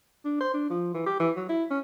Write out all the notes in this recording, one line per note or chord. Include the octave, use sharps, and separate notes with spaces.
D4
C5
D4
F3
E3
G4
E3
F#3
E4
C#4